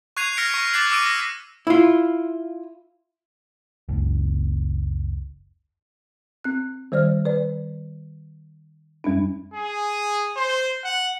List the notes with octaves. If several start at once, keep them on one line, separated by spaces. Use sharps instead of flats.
C#6 F#6 G#6 C7 D#7 F7
F6 A#6 B6 C#7 D7
C#6 B6 D7
D6 F#6 A6 C7 F#7
D6 E6 D7 D#7
A#6
E4 F4
F#1 C#2
C4 F#6
D#3 G3 C5 D5 F6
B4 D5
F#2 G3 C#4 D4
G#4
C5
F#5